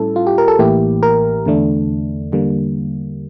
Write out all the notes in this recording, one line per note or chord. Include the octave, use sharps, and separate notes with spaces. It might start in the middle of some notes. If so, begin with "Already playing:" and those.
Already playing: A2 G3 C#4 E4 A4
F4
G4
A#4
A4
A1 A2 E3 A#3 E4 G4
A#4
E2 D3 A3 D4
E2 D3 G3 A#3